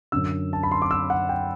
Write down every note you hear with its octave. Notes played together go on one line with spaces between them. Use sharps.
F#2 D3 E6
A5
B5
C6
D6
E6
F#5
G5